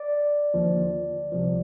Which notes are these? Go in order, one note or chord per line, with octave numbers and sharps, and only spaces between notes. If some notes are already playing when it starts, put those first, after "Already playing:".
Already playing: D5
D#2 D3 F3
C2 C3 F3